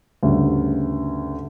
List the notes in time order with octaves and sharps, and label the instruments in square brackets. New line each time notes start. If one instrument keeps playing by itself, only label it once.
[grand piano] D2 G2 C#3